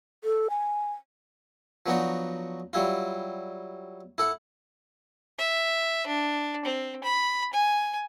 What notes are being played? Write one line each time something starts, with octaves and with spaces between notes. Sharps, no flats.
A4
G#5
F3 F#3 B3 D4 D#4 F#4
F#3 G3 E4 F4
E4 A4 F#5
E5
D4
C4
B5
G#5